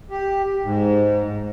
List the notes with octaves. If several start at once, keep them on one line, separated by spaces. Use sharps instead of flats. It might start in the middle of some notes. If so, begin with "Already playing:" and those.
G4
G#2